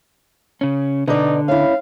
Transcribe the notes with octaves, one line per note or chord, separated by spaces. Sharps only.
C#3 C#4
B2 D3 D#4 D5
C#4 E4 F5